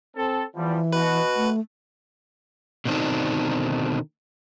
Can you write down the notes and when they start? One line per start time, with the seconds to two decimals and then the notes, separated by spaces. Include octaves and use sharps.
0.16 C4 A4
0.55 E2 E3 F3 G3
0.93 B2 F#4 B4
1.36 A3
2.85 B2 D3 D#3 C4 D4 D#4